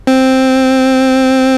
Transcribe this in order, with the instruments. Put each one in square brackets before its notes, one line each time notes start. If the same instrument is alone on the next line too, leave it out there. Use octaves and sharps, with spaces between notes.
[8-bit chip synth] C4